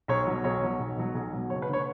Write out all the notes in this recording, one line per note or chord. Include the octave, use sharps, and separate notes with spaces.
B1 C#5
B2 F#3
B1 C#5
B2 F#3
B1
B2 F#3
B1
B2 F#3
F#1 C#5
B4
D3 C#5